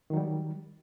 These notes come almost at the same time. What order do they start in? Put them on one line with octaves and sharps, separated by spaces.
D#3 F#3 G3